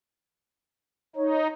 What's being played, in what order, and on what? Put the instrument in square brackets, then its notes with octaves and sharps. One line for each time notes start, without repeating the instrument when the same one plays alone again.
[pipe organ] D#4 [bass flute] C#5